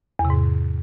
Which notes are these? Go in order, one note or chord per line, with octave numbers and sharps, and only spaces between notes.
E2
C3
G#2